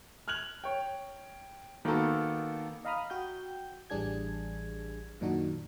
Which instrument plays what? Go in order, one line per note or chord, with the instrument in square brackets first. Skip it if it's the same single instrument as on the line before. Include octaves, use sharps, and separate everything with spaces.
[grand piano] F6 F#6 G#6 F7 F#7
C#5 G5
D#3 A#3 B3 D#4 F#4 A4
[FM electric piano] D#5 F5 A#5 B5 D#6 F6
F#4 G5 G6
A1 E3 G3 D4 G#4 G#6
F#2 A#2 D#3 D4 D#4 F#4